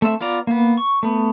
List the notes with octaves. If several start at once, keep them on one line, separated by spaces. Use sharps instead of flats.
A3 C4 E5
B3 F4 D5 A#5
A#3 B3
C#6
A3 B3